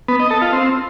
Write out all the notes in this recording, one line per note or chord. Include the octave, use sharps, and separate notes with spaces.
B3
D#5
A4
F4
C4